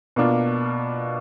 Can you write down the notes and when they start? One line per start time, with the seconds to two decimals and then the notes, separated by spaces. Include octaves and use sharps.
0.16 B2 A#3 D4 F4